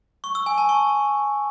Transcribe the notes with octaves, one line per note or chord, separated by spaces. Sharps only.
C#6
E6
G#5
A5
C#6